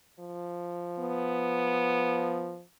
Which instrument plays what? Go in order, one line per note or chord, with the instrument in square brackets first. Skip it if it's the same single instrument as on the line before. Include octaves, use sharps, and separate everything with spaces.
[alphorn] F3
[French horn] B3